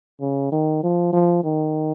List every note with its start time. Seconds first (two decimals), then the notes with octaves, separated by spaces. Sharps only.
0.21 C#3
0.52 D#3
0.83 F3
1.13 F3
1.44 D#3